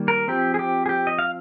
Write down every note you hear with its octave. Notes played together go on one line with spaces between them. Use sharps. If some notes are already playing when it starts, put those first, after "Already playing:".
Already playing: D#3 G3 A#3
A#4
F3 C4 G4
G#4
G4
G#4
G4
D#5
F5